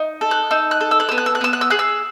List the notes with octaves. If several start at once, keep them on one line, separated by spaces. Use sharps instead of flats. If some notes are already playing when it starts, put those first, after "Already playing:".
Already playing: D#4
A4
F#6
D#4 E6
F#6
A4
E6
F#6
B3 E6
F#6
E6
F#6
B3 E6
F#6
E6
G#4 F#6
E6